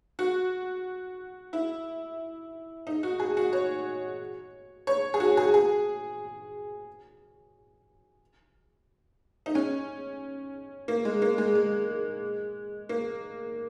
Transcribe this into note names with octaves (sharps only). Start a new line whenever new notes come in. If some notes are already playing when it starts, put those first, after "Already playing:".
F#4
E4
D#4
F#4
G#4
F#4
C#5
C#5
G#4
F#4
G#4
G#4
D#4
C#4
A#3
G#3
A#3
G#3
G#3
A#3